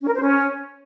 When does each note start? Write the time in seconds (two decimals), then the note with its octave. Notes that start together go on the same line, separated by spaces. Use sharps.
0.01 C#4
0.07 A#4
0.14 C5
0.20 C#4